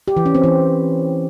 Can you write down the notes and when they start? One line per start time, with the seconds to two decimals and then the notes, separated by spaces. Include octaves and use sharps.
0.08 G4
0.17 E3
0.26 C#4
0.35 C4
0.44 E3